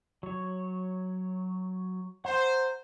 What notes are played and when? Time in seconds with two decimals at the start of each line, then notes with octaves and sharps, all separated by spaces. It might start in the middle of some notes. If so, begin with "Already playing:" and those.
0.23 F#3 C#5
2.25 C5 F#5 A#5 G6